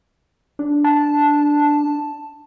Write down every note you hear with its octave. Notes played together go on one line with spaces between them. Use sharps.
D4
A5